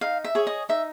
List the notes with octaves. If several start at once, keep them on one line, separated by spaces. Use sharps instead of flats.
D#4 F5
E5
G#4 C#5
D#5
D#4 E5